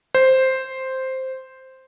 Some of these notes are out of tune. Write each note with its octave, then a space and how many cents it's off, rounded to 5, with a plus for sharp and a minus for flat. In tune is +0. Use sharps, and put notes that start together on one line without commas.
C5 +0